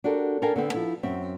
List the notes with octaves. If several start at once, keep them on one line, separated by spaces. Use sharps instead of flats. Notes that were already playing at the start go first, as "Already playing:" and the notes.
D4 F#4 G4 A4 A#4
D4 A4 A#4 F5 G5 G#5
D3 B3 C4
F3 E4
F#2 C4 E5